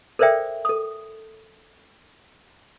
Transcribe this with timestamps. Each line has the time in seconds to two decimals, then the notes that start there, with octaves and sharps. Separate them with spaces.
0.19 A4 A#4 C5 D5 E5 G5
0.65 A4 D#6